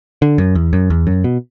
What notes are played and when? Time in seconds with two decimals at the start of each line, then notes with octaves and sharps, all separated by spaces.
0.22 D3
0.38 F#2
0.55 E2
0.73 F#2
0.90 E2
1.07 F#2
1.24 B2